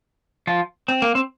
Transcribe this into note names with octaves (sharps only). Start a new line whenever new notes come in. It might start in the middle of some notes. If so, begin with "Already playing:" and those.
F3 F4
C4
A#3
C4